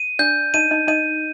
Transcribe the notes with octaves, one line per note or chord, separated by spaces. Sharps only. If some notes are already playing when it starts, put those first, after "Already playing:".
Already playing: D#7
D4 D5 G6
D#4 D#5 D#7
D#4 D#5
D#4 D#5 D#7